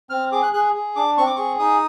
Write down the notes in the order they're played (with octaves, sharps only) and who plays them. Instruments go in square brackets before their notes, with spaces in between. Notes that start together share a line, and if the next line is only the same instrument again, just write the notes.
[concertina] C4 F6
G#4 D6
F#6
G#4 F#6
G#4
D4 D6
C4 C#6
D6
G#4 C#6
D#4 D#6